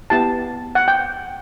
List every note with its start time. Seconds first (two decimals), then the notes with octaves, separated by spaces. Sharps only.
0.10 B3 E4 G4 A5
0.75 F#5
0.88 G5